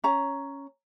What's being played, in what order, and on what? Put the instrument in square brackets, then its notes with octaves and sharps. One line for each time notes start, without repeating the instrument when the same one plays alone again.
[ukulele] C#4 C#5 A#5